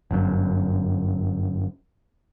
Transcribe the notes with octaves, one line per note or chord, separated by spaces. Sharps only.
G1 F#2